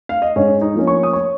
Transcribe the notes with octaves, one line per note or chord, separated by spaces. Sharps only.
F5
D#5
G#2 C#4 C#5
D#4 D#5
F3 A#3 C#4
C#5 C#6
D#6
C#5 C#6